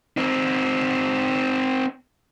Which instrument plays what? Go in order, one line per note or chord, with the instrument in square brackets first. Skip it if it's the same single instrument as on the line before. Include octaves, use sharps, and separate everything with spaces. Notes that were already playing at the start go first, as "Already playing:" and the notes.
[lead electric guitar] C4 D#4